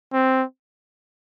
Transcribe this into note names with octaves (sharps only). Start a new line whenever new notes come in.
C4